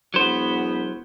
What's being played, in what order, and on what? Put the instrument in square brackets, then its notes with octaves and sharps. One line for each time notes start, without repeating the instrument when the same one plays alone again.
[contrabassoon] E1 [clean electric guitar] F#3 C5 [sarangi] B3